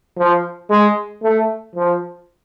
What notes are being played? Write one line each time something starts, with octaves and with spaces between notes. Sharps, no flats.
F3
G#3
A3
F3